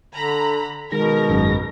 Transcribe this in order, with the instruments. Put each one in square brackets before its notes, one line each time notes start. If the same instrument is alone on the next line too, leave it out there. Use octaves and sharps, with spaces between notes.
[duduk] D3 [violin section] A#5 B5
[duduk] B2 [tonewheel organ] D#3 G#3 A#6 [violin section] A#4
[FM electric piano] G#1 F#2